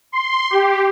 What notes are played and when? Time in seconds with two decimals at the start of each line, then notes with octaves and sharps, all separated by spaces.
0.12 C6
0.50 G4